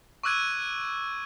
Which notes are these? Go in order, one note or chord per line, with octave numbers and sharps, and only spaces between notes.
C#6 D6 E6 F#6 G#6 D#7